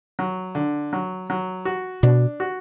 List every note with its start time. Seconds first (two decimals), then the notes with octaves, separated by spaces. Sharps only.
0.19 F#3
0.55 D3
0.93 F#3
1.30 F#3
1.65 F#4
2.03 B2 D4
2.40 F#4